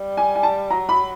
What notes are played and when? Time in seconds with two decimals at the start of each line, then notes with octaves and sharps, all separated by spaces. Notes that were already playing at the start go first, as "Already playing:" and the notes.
Already playing: G3
0.17 G#5
0.36 G#5
0.43 A5
0.70 F#3 A#5
0.89 B5